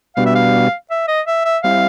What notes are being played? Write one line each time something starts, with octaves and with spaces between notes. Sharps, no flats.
B2 G3 B3 D4 F#4 F5
E5
F5
E5
D#5
E5
E5
G3 C4 E4 F5